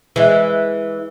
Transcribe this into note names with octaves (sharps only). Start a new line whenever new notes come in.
E3 G#3